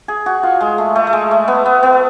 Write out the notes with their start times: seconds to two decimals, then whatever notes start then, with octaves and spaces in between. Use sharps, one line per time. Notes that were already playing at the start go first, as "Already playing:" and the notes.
0.08 G#4
0.26 F#4
0.43 F4
0.61 G#3
0.78 A3
0.96 A3
1.07 A3
1.13 G#3
1.31 A3
1.48 B3
1.66 B3
1.83 B3